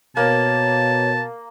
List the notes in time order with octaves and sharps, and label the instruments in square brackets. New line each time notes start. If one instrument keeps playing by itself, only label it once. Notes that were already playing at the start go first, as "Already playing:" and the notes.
[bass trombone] B2 [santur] A#3 [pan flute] C#5 [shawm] A5